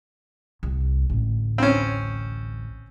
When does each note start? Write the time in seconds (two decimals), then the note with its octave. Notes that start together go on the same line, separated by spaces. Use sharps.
0.63 C2
1.10 A1 D2
1.58 C4 C#4